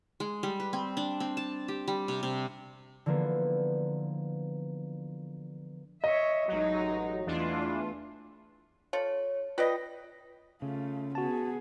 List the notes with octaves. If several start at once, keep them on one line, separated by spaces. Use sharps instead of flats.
G#3
G3
B4
C4
D4
C4
A5
G4
G3
C3
C3
D3 E3 F3 A#3 B3
C#5 D#5 E5
A1 F#3 G#3 D#4
E2 E3 A3 D4 F4
F4 A4 C#5
F4 B4 D5 D#5 G5 A#6
C#3 A3 F4
B3 F#4 G#4 A5